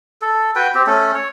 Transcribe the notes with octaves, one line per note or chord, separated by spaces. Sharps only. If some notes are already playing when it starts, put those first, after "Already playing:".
A4
F#4 B4 G5
C4 G4
A3 C#4 A4
C#5